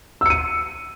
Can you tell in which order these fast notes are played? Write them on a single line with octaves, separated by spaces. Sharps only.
E6 C#7 D#7